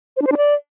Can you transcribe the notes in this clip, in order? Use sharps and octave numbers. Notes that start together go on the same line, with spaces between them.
C5
D4
C5
D4
D5